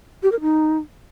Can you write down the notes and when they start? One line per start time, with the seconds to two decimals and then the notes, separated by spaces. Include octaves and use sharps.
0.23 G4
0.32 A#4
0.41 D#4